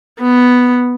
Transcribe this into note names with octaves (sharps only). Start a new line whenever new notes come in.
B3